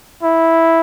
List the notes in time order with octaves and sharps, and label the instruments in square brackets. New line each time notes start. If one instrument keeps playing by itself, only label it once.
[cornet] E4